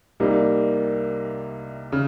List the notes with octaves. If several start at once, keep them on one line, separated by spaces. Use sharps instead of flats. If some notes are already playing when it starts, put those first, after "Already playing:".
C2 C3 G3 A#3 D#4
C#3